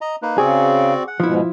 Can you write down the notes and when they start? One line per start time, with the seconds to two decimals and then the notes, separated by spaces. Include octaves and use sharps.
0.01 D#5 A#5
0.22 A#3 D#4 B4
0.38 C#3 C4 F#4 G#4 D5
1.07 F#5
1.20 G#2 B2 F3 E4